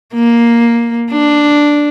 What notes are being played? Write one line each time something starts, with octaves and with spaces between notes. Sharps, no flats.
A#3
D4